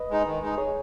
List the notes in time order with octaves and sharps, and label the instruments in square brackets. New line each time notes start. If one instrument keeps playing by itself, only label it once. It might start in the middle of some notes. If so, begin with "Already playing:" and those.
Already playing: [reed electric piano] B4 D#5
[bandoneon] G#3 D#4
D#3
G#3 D#4
[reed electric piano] G#4 C#5